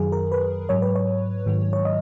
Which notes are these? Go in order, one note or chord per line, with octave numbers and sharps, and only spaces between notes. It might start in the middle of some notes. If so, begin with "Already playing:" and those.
Already playing: F#2 D#3 F#3 G#4
A#4
B4
G#2 F#3 C#5
B4
C#5
G#2 D#3 F#3
C#5
D#5